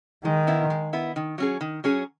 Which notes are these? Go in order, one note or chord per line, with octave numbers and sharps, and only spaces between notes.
D#3 G#3
B3 E4
G#3
B3 E4
D#3
F#3 C#4 G#4
D#3
F#3 C#4 G#4